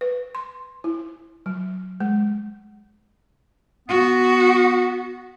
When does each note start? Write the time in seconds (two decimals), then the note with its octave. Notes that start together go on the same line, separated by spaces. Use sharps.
0.01 B4
0.35 C6
0.84 E4
1.46 F#3
2.00 G#3
3.88 B3 F#4